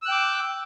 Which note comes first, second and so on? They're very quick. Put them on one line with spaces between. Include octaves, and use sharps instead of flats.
E6 F#6 G5 D6